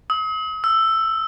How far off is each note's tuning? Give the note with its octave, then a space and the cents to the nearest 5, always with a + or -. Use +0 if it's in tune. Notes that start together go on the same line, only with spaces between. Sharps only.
D#6 +45
E6 +10